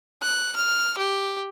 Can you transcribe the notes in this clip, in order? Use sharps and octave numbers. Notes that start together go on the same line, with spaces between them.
F#6
F6
G4